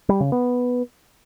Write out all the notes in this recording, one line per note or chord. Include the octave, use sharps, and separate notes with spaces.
G3
C#3
B3